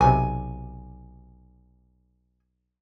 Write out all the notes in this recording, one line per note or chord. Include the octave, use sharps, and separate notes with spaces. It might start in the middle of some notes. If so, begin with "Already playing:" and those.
B1 C3 G#5